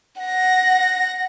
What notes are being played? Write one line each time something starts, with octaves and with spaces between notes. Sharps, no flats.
F#5 A#6